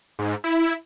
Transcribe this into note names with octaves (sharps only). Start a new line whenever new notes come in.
G#2
E4